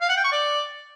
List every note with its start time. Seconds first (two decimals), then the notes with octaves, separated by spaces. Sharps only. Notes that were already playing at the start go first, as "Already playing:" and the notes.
0.01 F5
0.09 F#5
0.17 G5
0.24 C#6
0.32 D5